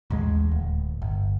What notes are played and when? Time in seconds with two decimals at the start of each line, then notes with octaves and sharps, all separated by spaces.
0.10 A1 D#2 G#3
0.52 D1
1.02 G1